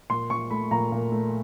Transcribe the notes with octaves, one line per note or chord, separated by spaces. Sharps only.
A#2 C6
A#2 C#6
A3 B5
A#2 A#5
A#2
A3